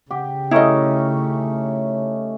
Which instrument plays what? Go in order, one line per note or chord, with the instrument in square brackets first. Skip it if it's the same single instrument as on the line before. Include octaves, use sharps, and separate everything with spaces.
[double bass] C#3 [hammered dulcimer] G4
[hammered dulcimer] A3 C#4 D#4 [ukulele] E4 D#5